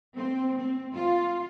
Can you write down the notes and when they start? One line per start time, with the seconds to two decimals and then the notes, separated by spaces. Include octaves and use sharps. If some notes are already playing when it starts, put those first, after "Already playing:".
0.16 C4
0.58 C4
0.93 F4